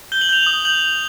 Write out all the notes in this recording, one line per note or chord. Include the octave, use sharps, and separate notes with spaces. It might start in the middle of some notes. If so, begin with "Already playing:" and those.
G6 G7
F#7
G6 F7
F#7
D#6
G6 F#7
G6